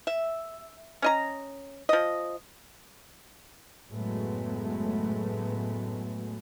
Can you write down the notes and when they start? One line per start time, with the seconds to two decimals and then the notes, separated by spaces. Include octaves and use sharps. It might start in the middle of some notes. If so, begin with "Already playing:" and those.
0.07 E5
1.02 C#4 D#5 A#5
1.89 F3 D#5
3.90 F#1 A2 F#3 G#3 A3 B3